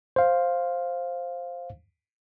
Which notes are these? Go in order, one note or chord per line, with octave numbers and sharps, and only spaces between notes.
C5 F5